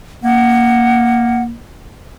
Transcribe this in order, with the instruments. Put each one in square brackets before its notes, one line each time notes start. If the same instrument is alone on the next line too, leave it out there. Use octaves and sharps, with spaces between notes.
[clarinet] A#3 [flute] F#5